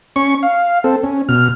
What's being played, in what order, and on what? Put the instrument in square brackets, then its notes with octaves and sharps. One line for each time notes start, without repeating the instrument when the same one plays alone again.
[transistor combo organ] C#4 C#6
F5
C4 A4
C#4
B2 F6